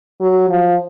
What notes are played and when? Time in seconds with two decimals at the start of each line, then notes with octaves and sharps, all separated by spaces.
0.21 F#3
0.50 F3